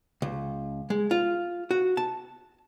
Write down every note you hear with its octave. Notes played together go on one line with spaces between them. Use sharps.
C#2
G#3
F4
F#4
A5